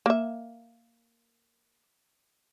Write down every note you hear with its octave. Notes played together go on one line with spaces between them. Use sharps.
A#3 E5